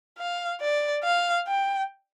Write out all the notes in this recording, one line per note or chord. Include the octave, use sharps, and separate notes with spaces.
F5
D5
F5
G5